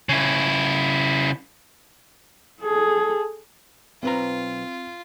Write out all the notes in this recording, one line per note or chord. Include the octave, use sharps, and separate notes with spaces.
C#3 E4
G#4 A4
B1 C4 F4 B4 A#5